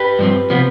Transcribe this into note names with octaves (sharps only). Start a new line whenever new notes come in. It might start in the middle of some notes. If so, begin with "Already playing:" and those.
Already playing: G4 B4
G2 F3 C4
C3 F3 B3